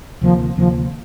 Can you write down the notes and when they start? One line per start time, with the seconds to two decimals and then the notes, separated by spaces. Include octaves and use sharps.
0.21 D2 C3 D#3 F3 A#3
0.57 D2 C3 D#3 F3 A#3